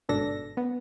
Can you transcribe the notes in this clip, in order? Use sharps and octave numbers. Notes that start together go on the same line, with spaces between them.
G1 G#2 B2 D4 A4 A#6
B3